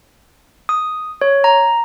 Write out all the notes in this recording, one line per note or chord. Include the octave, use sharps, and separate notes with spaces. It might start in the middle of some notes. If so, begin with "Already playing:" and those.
D#6
C#5
A#5